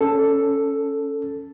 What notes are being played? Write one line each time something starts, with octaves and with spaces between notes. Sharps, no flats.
C#4 A4